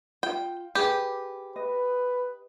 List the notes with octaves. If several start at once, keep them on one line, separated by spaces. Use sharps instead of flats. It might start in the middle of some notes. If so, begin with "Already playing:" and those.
F4 G5
G4 G#4 B4
B4 D#5